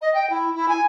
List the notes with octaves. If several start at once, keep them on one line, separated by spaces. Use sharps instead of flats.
D#5
G5
E4
E4
G#5